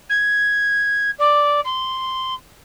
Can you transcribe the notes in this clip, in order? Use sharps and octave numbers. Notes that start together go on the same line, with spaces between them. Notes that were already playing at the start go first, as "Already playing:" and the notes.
G#6
D5
C6